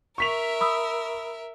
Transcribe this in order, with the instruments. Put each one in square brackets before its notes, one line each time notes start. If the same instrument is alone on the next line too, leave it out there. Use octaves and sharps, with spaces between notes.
[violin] A#4 E5 [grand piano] C#6 B6 F7
[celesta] B5 D#6 E6